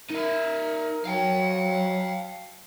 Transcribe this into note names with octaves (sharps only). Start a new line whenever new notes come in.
D#4 A#4 E5
F#3 F5 G5